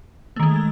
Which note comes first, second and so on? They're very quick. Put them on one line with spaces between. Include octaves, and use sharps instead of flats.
A3 D#3 G#3